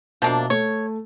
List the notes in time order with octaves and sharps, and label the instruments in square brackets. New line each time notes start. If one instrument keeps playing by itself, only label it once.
[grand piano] B2 E5 A5 [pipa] F3 A#3 D4
[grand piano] A3 [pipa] C#5